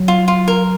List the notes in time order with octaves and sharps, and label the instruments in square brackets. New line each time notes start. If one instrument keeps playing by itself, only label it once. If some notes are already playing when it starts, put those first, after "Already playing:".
Already playing: [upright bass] F#3
[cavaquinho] F4
F4
A#4